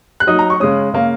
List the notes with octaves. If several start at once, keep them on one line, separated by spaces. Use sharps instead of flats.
F#6
F#3 D#4 D#6
A#5
C#6
C#3 G#3 C#4 D#6
C#3 A#3 C#4